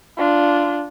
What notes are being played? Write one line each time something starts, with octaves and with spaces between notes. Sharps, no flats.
D4 F4